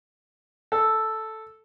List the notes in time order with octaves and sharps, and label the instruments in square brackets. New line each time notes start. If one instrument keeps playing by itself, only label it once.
[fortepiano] A4